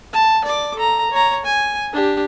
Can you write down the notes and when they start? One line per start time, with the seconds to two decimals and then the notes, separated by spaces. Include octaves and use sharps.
0.13 A5
0.45 D5 D6
0.76 A4 A#5
1.11 C#5 A#5
1.45 G#5
1.93 D4 G4